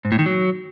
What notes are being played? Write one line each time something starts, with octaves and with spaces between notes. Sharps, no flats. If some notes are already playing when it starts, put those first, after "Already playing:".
G#2
A2
D#3
F#3